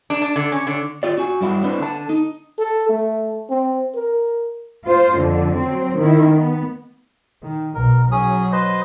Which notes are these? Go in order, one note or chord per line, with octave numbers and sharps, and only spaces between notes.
D4
D4
D3
C#4
D3
F4 G4 D5
F#4 G#5
G2 G3 E4 F#4
C4 D4 E4 B4
D3 A5
D#4
A4
A3
C4
A#4
F4 C5
F2 D3
F#3 C4
D#3 E4
B3
D#3
B1 B2 A#4
F#3 C#4 G#4 D#6
B4 C5 D#5